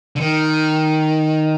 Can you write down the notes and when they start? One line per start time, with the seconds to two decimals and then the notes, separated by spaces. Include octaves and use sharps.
0.16 D3
0.20 D#3